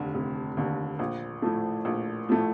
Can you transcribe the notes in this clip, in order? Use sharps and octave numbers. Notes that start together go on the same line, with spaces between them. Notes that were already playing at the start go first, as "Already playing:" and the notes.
Already playing: F1 D#2 D3
F1
D#2 D3
A#1
A2 F3 A3
A#1
A2 F3 A3